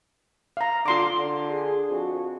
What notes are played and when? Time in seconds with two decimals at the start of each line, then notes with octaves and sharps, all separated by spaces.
0.57 F5 A#5
0.86 D3 F4 C6 D6
1.17 D3
1.48 G#4
1.90 F2 F#4